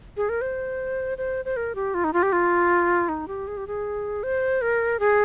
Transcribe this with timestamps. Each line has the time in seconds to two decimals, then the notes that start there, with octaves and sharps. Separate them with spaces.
0.17 G#4
0.29 A#4
0.41 C5
1.18 C5
1.45 C5
1.57 A#4
1.75 G4
1.94 F4
2.04 D#4
2.13 F4
2.23 G4
2.33 F4
3.09 D#4
3.28 G4
3.48 G#4
3.57 G4
3.67 G#4
4.23 C5
4.62 A#4
5.00 G#4